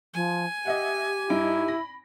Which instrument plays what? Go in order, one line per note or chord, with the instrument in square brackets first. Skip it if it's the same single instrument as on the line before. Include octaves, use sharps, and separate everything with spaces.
[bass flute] F3 [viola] G#5
[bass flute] G4 [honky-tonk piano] D#5 E5 F#5
[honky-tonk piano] G2 D#4 D7 [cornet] E4
[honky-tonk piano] B5 A#6